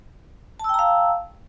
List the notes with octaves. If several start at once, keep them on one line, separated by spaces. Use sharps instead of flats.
F5 G5 A5 A#5 E6